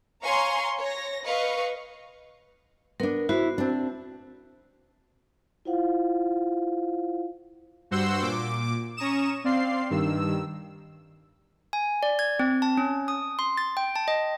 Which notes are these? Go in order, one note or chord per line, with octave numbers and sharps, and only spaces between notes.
C#5 F5 G#5 A#5 C6 C#6
C#5 A#6
B4 D#5 F5 C#6
B3 D4 A#4
E4 F#4 C5
C4 D4
E4 F4 C5 F5 F#5
G2 F#4 C5 F#5 C6 E6
A#2 D6
C#4 A#5 C#6 D#6 E7
C4 D5 F5 C6 C7
G2 D#3 E6
G#5
D5
G#6
C4
A5
C#4
D#6
C6
A6
G5
A5
D#5